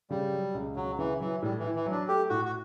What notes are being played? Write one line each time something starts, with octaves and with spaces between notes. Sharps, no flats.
C#3 G3
F#3
C#2
C#2 F#3
C#3 E3
E3 F#3
A2 G3
E3
E4
E3
F#3
D4
A3 G4
A2 F#4
F#4